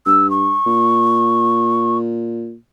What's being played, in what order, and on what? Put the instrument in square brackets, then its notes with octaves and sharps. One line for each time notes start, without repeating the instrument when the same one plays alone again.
[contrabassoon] G2 [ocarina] E6
[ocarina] C#6
[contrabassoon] A#2